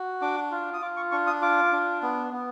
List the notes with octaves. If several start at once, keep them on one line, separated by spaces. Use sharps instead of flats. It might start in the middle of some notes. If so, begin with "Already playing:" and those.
Already playing: F#4
D4 D6
F4
D#6
F4 D6
C#6
D4 C#6
D#6
F4 D6
D4
B3
B3